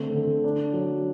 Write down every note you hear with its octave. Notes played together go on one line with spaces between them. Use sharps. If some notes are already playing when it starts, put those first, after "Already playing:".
Already playing: D3 A3 C4
D3
D4
F#3